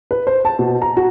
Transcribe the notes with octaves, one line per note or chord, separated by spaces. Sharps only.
B4
C5
A5
B2
A#5
F#4